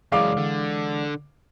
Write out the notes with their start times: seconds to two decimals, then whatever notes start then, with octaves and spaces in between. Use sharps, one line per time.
0.12 F#2 C#3 E3 G#3 D5 F5 D6
0.37 D3